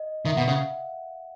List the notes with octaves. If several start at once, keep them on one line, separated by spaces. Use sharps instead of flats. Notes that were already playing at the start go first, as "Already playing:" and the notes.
Already playing: D#5
D#3 E5
B2 F#5
C#3 F5